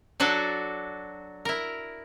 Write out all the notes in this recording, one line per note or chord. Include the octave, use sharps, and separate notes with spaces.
F#3 D4 F#4 A4
E4 A#4